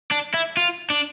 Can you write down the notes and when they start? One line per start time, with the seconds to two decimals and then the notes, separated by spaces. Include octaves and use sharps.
0.11 D4
0.34 E4
0.57 F4
0.90 D4